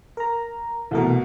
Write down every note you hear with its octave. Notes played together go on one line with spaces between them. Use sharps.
A#4 A#5
C2 B2 E3 A3 A#4